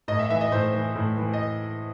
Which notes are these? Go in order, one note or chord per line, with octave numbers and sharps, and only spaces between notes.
A2 D#5
E5
E3 E5
D#5
A2 C5
E3
A2
E3
D#5